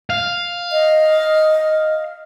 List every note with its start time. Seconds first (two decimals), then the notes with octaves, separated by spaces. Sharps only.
0.10 F5
0.72 D#5